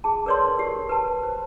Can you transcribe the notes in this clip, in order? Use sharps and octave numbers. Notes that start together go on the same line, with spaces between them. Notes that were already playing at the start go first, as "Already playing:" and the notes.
G#4 A5
A#4 B4 C#5 D5 C6
G4
B4 A5
C5